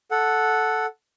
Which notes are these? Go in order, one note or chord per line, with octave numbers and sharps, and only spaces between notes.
A4 F#5